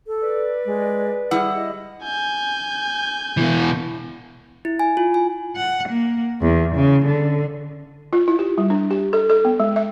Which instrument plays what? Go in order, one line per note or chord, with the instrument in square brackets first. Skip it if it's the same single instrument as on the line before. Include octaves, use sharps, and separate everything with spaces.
[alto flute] A4
[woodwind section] B4 D5
[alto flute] G#3
[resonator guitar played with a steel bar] G3 E4 F#5 [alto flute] G#4
[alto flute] D#5
[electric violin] G#5 G6
[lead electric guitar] B2 E3
[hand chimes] E4
G#5
F4
G#5
[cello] F#5
A#3
E2
C#3
D3
[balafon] F4
E4
G4
G3
D4
G4
A4
A4
B3
G#3
E5